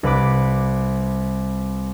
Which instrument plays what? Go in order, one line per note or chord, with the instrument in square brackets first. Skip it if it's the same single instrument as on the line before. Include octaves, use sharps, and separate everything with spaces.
[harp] C2 B4 B5 D6